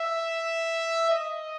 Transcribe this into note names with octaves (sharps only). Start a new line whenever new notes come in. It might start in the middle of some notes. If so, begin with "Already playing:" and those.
Already playing: E5
D#5